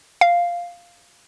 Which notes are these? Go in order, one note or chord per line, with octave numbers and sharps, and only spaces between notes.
F5